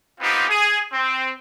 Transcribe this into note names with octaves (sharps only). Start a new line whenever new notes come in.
B3 C4 D#4 F4 G4
G#4
C4